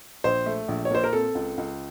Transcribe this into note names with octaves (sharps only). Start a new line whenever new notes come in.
A#1 C5
A3
A#1
C#5
A#2 C5
A#4
C4 A4
C#2
C#2